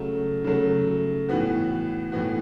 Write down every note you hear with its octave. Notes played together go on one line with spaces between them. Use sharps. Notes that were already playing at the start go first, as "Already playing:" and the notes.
Already playing: C#3 F#3 A3
C#3 F#3 A3
A2 E3 B3 F#4
A2 E3 B3 F#4